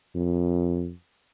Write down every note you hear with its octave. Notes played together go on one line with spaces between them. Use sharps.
F2